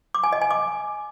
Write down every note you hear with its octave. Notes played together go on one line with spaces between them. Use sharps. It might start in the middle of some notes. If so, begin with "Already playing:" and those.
D6
G#5
D#5
G#5
D6